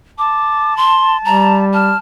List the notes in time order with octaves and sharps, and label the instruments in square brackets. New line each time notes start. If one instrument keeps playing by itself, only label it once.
[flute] A5 [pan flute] D6
[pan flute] C6
[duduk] G3 [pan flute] A#5
[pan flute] A5 [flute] F6